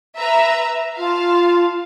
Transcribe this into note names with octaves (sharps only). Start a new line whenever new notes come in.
B4 E5 A#5
F4 F5 A5